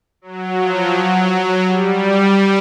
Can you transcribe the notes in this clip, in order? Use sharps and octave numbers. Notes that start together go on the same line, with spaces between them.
F#3
F3
F#3
G3